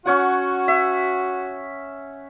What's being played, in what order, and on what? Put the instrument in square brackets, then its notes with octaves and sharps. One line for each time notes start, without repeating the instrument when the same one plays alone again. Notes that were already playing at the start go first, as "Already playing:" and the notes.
[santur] C#4 C#5 F#5 [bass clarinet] F#4
[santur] E5